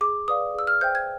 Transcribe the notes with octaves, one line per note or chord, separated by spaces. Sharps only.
G#4 D6
B4 D5 F5 D#6
G#4 E6
F6
C5 E5 G5 G6
G#6